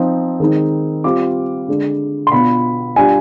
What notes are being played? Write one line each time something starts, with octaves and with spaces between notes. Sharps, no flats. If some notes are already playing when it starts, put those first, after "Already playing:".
Already playing: F3 C4 D#4
D#3 G#3 C4 D#4
G3 C4 F4 D6
D3 G#3 D4
C6
B2 B3 D4 F4 B5
G3 D4 F4 G#5